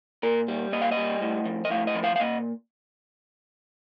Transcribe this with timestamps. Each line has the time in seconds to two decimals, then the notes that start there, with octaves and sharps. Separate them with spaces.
0.23 A#2 A#4
0.48 G3
0.72 A#2 D#5
0.82 F5
0.91 D#5
0.97 G3
1.22 A2
1.46 F3
1.65 D#5
1.71 A2 F5
1.87 D#5
1.95 F3
2.04 F5
2.16 F5
2.20 A#2 D#5